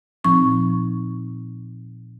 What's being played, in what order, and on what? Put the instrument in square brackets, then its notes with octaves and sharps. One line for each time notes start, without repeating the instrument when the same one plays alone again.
[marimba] A#2 F3 C4 D#4 C#6